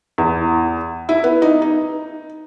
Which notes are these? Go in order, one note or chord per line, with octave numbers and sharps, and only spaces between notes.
E2
E4
B3
D#4
D#4